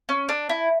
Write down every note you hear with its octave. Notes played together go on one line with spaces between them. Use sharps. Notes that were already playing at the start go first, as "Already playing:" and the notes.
C#4
D4
E4